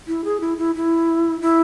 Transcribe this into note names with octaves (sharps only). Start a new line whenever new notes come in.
E4
G#4
E4
E4
E4
E4